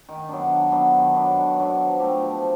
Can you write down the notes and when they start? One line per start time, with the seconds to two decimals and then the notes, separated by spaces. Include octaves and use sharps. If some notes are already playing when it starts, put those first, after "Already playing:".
0.09 D#3
0.29 F#3 B3 D4
0.51 D#3
0.71 F#3 B3 D4
0.94 D#3
1.14 F#3 B3 D4
1.37 D#3
1.58 F#3 B3 D4
1.78 F3
1.99 A3 D4 G4
2.21 F3